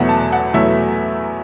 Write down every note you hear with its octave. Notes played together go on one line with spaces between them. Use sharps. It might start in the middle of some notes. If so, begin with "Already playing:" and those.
Already playing: E2 B2 F#3 A3 F#5
A5
F#5
E2 B2 F#3 A3 E5